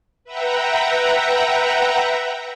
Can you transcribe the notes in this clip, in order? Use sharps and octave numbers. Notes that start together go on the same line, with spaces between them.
B4 E5 F#5 G5 A#5